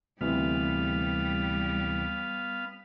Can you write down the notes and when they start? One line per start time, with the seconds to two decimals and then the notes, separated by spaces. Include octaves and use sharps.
0.21 D2 C3 E3 G3 B3 F5